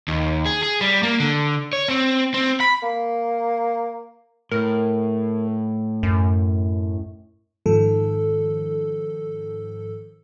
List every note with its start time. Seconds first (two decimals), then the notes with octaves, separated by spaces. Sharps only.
0.08 D#2
0.45 G#4
0.63 G#4
0.81 G3
1.03 A#3
1.20 D3
1.73 C#5
1.88 C4
2.34 C4
2.60 B5
2.83 A#3
4.51 A2 A#4
6.03 F#2
7.66 G#2 D#3 F3 A4